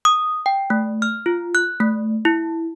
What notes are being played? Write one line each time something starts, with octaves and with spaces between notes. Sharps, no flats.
D#6
G5
A3
F6
F4
F#6
A3
E4